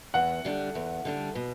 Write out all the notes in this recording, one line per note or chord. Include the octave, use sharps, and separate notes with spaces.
E2 F#5
D3 G3 D4
E2
D3 G3 D4
B2